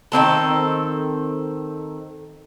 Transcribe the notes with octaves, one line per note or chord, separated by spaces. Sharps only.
D#3 E3 C4 A4